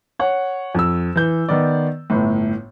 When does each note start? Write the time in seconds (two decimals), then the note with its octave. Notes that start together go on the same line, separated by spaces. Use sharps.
0.19 C#5 F#5
0.75 F2 E6
1.15 E3 G6
1.49 D#3 B3 D5
2.10 G1 A2